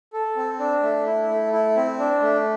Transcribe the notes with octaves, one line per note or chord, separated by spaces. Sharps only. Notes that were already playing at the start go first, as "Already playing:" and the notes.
A4
C4
D4
A3
E4
A3
E4
C4
D4
A3